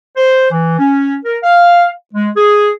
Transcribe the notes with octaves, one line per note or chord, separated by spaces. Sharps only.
C5
E3
C#4
A#4
F5
G#3
G#4